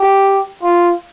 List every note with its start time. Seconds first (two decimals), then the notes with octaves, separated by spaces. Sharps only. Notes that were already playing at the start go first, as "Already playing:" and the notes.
Already playing: G4
0.62 F4